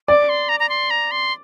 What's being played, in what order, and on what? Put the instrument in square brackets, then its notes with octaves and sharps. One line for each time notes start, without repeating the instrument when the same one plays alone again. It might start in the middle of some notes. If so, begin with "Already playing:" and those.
[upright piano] D5 [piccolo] D6
[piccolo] C6
A#5
A#5
C6
A#5
C6